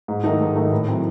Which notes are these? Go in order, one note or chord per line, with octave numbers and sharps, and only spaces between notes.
G#2
D#3 A3 D#4
G#2
D#3 A3 D#4
A2
F#3 C4 E4